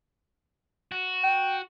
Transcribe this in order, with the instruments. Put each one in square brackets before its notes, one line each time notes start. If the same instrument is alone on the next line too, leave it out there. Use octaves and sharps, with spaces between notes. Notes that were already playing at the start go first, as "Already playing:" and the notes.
[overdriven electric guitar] F#4
[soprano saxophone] G5